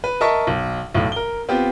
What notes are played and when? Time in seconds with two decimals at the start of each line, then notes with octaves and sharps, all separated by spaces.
0.04 B4
0.21 A#4 D#5 E5 A5 C#6
0.47 B1
0.94 B1 A2
1.12 A#4 G7
1.49 B3 C4 F4 G4